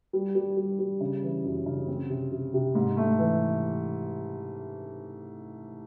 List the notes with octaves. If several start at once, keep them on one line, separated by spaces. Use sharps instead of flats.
G3
G3
G3
G3
C#3
E3
F#2
C#3
C4
C3
C3
C3
G#2
A3
E3